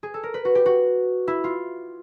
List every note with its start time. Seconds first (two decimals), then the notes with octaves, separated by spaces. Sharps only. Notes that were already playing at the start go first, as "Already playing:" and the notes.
0.03 G#4
0.14 A4
0.23 A#4
0.34 B4
0.45 F#4
0.55 G4
0.66 F#4
1.27 E4
1.44 F4